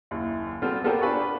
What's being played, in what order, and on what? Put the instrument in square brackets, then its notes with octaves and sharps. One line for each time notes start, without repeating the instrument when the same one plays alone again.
[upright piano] F#1 D#2 E4
G3 B3 C4 F4 F#4 A4
B3 F4 G4 A4 A#4 C5
D4 G4 B4 F5 G#5 C#6
B5